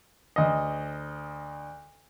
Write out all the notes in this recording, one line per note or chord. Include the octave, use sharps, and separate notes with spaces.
D2 D#5